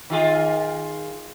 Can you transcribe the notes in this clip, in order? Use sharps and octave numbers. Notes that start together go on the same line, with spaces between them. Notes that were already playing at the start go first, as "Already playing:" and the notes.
D#3 F4 G#4